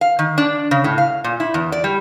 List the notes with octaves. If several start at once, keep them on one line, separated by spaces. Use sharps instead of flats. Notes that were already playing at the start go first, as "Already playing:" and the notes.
F5
D#3
D4
C#3
A2
F5
A#2
E4
E2
D5
G3